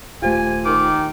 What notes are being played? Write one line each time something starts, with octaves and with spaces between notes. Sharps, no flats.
D#1 A3 F4 G4 C5 G#5
D#3 D6